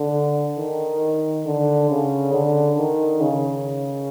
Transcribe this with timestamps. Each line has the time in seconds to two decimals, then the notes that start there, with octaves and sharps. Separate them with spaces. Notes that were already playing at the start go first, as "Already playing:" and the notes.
Already playing: D3
0.57 D#3
1.46 D3
1.90 C#3
2.33 D3
2.78 D#3
3.21 C#3